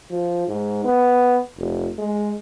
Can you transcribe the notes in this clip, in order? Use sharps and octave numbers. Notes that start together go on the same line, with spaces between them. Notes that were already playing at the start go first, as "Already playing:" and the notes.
F3
G#2
B3
F1
G#3